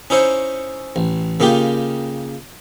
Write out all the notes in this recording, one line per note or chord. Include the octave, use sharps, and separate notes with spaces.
C#4 D#4 E4 C5 C#5
A1
C#3 A#3 D#4 F4 G4